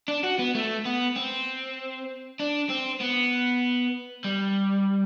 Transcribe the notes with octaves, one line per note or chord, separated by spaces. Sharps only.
D4
F#4
B3
A3
B3
C4
D4
C4
B3
G3